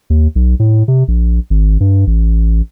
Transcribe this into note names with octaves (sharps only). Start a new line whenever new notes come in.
D#2
B1
A2
C3
A#1
G#1
G2
A1